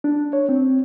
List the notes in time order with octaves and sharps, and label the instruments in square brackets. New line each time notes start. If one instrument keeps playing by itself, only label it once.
[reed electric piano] D4
C#5
C4